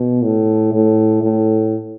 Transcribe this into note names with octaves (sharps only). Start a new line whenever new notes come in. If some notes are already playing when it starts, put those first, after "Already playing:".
Already playing: B2
A2
A2
A2